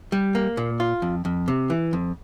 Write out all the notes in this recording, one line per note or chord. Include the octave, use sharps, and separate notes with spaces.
G3
A#3
A#2
F4
F2
F2
C3
E3
F2